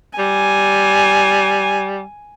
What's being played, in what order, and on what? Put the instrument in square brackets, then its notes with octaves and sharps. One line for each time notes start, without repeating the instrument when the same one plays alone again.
[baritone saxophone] G3 [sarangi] G#5